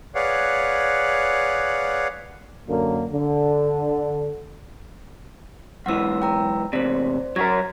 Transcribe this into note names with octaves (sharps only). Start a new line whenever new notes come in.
G#4 B4 C#5 D5 F5 F#5
F#2 D3 A#3
D3
B1 G#2 E3 F#5 E6
G5 A#5 E6
E2 C3 C5 D5
F#3 F#4 A#4 G#6